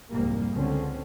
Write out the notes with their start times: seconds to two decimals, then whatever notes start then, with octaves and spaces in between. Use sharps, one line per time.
0.11 C2 F2 G#2 G3 A#3
0.52 C#2 D3 C4 C#4